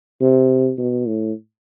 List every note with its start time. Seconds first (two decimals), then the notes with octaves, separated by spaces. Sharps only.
0.21 C3
0.78 B2
1.07 A2